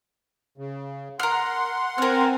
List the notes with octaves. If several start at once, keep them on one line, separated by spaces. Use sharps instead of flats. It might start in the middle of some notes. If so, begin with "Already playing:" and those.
C#3
A#4 F#5 C6 F6
C4 A#4 G#5 F6